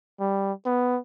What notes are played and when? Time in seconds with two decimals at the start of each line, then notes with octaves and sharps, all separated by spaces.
0.20 G3
0.66 B3